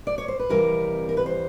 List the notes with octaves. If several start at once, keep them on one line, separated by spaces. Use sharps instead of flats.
D5
C#5
C5
B4
F2 C3 E3 G3 A#4
A#4
B4
C5